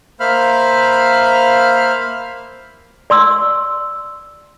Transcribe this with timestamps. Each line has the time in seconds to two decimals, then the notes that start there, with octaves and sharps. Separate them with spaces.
0.20 A#3 C5 E5 F5 B5 F6
3.10 D5 C6 E6